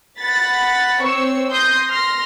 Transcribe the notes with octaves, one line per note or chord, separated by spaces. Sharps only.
F#5 B5 A6 B6
C4 C#5 C#6 E6
C6 D#6 G6 A#6
C6 F6 A#6